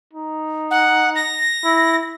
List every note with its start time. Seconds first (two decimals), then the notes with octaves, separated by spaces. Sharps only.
0.13 D#4
0.71 F#5
1.16 A#6
1.64 E4